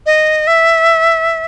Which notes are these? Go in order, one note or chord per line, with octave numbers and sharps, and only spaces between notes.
D#5
E5